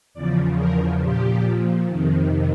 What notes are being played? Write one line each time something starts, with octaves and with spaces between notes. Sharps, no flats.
E2 C#3 F3 D5
A#4
A#2 F3 G4
F2 C3 D#3